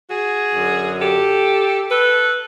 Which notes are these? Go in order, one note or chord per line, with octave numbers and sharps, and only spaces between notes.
F#4 G#4
F#2 D3
G4 A4
A4 B4